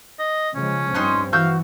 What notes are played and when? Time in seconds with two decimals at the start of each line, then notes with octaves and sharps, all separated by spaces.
0.19 D#5
0.55 C#3 F3 G#3 C#4
0.94 G2 C4 D#4 C6 F#6
1.33 E3 F#4 F5 E6 G6